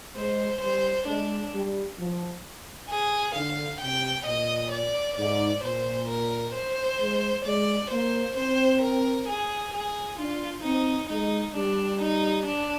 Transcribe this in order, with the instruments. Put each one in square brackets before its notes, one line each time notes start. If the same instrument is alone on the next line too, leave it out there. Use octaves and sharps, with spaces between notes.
[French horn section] G#3 [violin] C5
[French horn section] G3 [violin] C5
[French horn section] G#3 [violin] D4
[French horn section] G3
F3
[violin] G#4
[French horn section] D3 [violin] F5
[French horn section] C3 [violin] G5
[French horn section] A#2 [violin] D#5
[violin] D5
[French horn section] G#2 [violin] D5
[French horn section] A#2 [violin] C5
[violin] A#4
C5
[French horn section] G#3
[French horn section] G#3 [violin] D5
[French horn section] A#3 [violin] C5
[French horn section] C4 [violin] C5
[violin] A#4
G#4
G#4
[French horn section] D4 [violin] F4
[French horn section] C4 [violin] D#4
[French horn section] G#3 [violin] D#4
[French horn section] G3 [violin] D4
[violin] D#4
D4